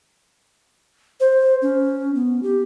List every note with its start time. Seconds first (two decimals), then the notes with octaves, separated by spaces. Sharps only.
1.20 C5
1.62 C#4
2.15 B3
2.43 G4